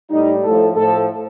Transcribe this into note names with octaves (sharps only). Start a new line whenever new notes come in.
A2 G3 D#4
A2 F3 A4
A2 F3 A4